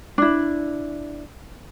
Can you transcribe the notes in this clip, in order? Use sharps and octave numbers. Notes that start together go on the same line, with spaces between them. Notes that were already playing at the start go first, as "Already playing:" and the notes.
D4 E4